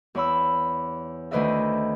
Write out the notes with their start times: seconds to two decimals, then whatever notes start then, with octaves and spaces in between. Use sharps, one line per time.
0.15 E2 C#5 B5 E6
1.31 D2 D#3 B4 C5 D#5 E5